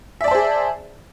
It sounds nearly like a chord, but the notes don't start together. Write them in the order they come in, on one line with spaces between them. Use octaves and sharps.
E5 D5 A5 C5 G#4